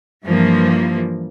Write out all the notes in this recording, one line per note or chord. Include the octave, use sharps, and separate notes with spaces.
G2 E3 F3 A#3